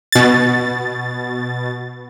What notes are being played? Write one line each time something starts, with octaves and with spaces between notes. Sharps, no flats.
B2 A6